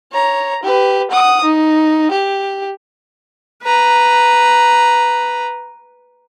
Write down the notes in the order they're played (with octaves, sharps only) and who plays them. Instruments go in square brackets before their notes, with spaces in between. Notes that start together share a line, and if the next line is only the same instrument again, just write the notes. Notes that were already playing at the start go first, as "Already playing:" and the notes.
[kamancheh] C#5 A#5
G4 B4
F#5 D#6
D#4
G4
[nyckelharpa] B4 A#5